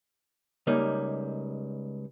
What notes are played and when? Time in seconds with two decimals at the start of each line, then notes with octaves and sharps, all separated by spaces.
0.67 C#2 G3 A#3 D#4